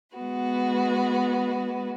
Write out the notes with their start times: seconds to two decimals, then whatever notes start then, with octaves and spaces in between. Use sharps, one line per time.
0.16 G#3 B3 F#4 B4